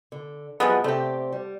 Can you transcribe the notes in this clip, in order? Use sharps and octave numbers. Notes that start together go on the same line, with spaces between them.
D3
E2 F3 F#3 G#3 B3 F#5
C3 A3 C4 G4 D5
G3